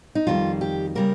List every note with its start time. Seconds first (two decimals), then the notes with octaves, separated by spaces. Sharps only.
0.15 D#4
0.27 F2 D#3 G3 F4
0.61 G4
0.95 C#3 G3 A#3 A#4